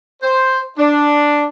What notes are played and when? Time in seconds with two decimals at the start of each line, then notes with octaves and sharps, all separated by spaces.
0.23 C5
0.79 D4